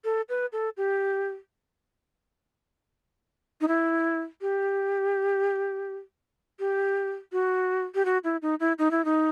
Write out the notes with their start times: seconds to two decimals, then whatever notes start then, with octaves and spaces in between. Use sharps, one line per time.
0.04 A4
0.29 B4
0.52 A4
0.77 G4
3.61 D#4
3.68 E4
4.41 G4
6.59 G4
7.32 F#4
7.95 G4
8.05 F#4
8.24 E4
8.42 D#4
8.60 E4
8.78 D#4
8.91 E4
9.05 D#4